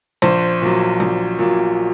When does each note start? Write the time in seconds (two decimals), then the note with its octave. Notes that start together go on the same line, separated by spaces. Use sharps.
0.22 A#1 C5
0.62 A#2 F#3
1.00 A#1
1.39 A#2 F#3